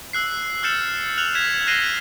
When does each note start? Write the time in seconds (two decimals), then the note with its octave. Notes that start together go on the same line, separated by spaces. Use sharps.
0.13 E6 F#6 C7
0.63 E6 F6 G6 A6 C#7 E7
1.18 F6 F#6 F7 F#7
1.35 G#6 B6 E7 F7
1.67 F#6 A#6 C7 D#7 E7 G7